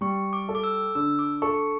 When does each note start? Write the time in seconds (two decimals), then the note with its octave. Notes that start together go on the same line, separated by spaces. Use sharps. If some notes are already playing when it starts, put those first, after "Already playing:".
0.01 G3 C#6
0.33 D6
0.49 A4
0.55 D6
0.64 E6
0.95 D3 E6
1.19 D6
1.42 A4 C#6